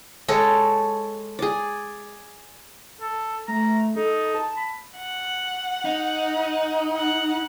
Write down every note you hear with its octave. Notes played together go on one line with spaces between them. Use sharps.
G#3 A4 C#5
G#4 D5
A4
A3 A#5
D#4 A4
A5
B5
F#5
D#4
F#5